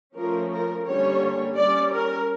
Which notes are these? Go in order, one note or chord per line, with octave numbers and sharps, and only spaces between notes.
F3 A3 C#4 A#4
A#4
D3 G3 A#3 C#4 C#5
G3 C#4 D5
A#4